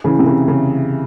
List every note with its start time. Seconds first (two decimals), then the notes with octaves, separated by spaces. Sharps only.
0.04 C#3 E3
0.19 C3
0.26 C#3
0.48 C#3